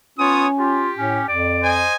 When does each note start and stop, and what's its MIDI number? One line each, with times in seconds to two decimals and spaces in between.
0.18 0.45 59
0.18 0.90 61
0.18 0.45 65
0.18 0.45 73
0.18 0.45 87
0.59 0.91 65
0.59 1.30 67
0.98 1.21 45
0.98 1.24 61
1.28 1.86 41
1.28 1.70 74
1.62 1.95 72
1.62 1.95 75
1.62 1.95 80